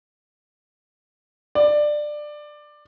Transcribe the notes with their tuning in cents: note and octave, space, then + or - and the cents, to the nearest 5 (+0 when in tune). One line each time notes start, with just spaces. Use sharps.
D5 +15